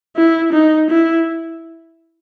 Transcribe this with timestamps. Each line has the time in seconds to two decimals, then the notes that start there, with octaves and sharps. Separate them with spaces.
0.17 E4
0.53 D#4
0.90 E4